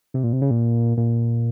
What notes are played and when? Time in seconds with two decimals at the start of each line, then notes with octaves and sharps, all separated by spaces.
0.14 C3
0.24 A#2
0.33 C3
0.42 C#3
0.51 A#2
0.97 A#2